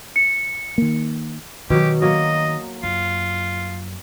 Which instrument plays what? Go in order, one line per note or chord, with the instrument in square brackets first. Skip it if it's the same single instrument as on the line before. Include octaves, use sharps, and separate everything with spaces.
[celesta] C#7
[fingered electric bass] D#3 A#3
[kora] B2 F#3 [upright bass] D#3 [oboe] G4
[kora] F#3 A#3 [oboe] D#5
[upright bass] F#2 [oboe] F4